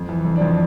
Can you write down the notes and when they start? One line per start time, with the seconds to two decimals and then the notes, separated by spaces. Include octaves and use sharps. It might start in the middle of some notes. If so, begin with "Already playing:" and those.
Already playing: F2
0.09 E3
0.25 F2
0.36 D4
0.41 F2